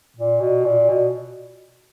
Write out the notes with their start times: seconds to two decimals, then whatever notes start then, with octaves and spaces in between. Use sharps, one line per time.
0.17 A#2
0.40 B2
0.65 A#2
0.89 B2